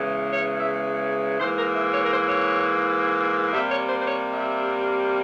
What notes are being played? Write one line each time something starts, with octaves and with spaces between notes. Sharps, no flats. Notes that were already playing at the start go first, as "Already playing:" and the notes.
Already playing: E2 C#3 E3 G#3
C#5
E5
G#2 E3 A#3 C5
A#4
E5
C#5
A#4
C5
C#5
C3 G3 A#3 E5
C#5
C5
C5
C#5
E5